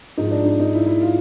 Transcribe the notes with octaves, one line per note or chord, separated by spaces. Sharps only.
G#2 F3 G#3 D#4
D4
D#4
D#4
E4
E4
F4